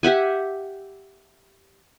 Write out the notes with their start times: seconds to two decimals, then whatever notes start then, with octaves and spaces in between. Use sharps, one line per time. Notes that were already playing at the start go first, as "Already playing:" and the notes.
0.03 G4 E5 F#5 G#5